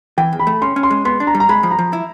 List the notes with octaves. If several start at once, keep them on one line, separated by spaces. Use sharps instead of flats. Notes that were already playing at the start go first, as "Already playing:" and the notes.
E3 G5
E2
B5
A3
C#4 C6
C#4
C6
G#3
B3 C6
D4
A#5
G3
A#5
G#3 B5
F3
A#5
F3
E4